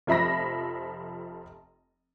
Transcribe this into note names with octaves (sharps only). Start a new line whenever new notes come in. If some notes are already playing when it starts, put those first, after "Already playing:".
F1 F3 E5 B5 A#6